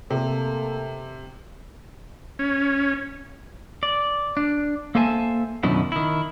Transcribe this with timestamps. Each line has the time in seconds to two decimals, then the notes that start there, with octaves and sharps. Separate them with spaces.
0.10 C3 A3 A#3 A4
2.39 C#4
3.83 D5
4.37 D4
4.95 A#3 A4 C5 E5 G#5 A5
5.63 F#2 B2 D3 D#3 F#3 E4
5.92 D#3 E4